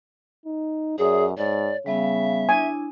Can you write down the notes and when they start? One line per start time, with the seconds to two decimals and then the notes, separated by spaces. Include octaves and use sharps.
0.45 D#4
0.98 F#2 G#4 C#5 D5 E5
1.37 G#2 C#5 D5
1.86 C#3 G3 B3 E5 F5
2.49 D4 E4 G#5